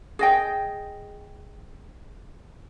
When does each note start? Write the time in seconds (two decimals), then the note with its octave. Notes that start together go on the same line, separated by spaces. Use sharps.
0.19 G#4 D#5 G5